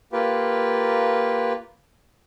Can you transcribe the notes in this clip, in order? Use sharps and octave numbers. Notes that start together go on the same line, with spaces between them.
A#3 F4 G4 B4